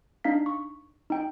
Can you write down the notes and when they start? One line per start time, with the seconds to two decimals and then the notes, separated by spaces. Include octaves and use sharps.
0.24 D4 D#4 F5 B6
0.46 C#6
1.10 D#4 G5